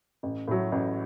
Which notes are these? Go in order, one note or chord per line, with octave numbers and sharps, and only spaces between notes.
A1
A2 F#3
A1